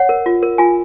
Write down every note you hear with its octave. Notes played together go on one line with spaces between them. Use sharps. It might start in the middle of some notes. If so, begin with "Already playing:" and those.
Already playing: C#5 F#5
A#4
F4
A#4
F4 G#5